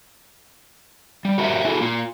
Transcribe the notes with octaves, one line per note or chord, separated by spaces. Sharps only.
G3
F#4 G4 A#4 C5 E5
E4 F#4 G#4 A4
A#3 F4